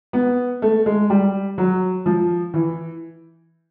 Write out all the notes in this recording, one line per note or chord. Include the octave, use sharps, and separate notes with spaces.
B3
A3
G#3
G3
F#3
F3
E3